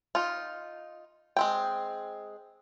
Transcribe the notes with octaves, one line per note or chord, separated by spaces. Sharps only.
D#4 F4
G#3 C4 G5